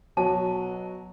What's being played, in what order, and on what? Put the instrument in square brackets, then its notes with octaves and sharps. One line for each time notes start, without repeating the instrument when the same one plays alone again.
[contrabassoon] B2 [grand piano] F#3 [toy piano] A5